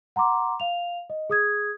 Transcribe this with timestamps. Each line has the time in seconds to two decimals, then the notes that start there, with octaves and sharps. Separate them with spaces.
0.16 F#5 A#5 C6 D6
0.60 F5 F7
1.10 D#5
1.30 G#4 D#6 G#6